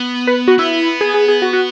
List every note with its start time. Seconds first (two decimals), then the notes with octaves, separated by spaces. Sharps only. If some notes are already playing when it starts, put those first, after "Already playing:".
Already playing: B3
0.27 B4
0.48 F#4
0.58 B3 E4
1.01 G#4
1.14 G#4
1.28 G#4
1.42 F#4
1.53 F#4